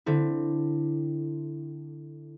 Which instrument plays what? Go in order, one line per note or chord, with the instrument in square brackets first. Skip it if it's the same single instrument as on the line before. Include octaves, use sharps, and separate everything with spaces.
[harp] D3 C4 E4